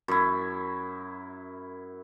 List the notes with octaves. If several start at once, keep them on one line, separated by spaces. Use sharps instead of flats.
F#2 E4